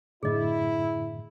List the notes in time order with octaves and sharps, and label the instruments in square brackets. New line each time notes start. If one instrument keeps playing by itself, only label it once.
[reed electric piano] F#2 A2 D3 [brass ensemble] E4 [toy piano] G#4 D#5